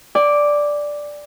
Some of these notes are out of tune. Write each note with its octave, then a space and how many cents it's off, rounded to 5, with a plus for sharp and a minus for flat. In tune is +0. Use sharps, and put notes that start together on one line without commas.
D5 +0 G#5 -45